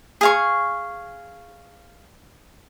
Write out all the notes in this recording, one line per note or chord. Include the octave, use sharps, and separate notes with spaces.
G#4 F5 C#6